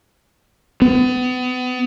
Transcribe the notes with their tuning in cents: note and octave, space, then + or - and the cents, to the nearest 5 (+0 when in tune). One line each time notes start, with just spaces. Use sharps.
B3 +30